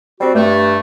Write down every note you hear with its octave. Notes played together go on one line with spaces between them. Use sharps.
G3 C4 F#4
G2 A3